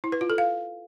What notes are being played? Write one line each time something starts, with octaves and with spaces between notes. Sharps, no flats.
E4
B4
F4
A4
F5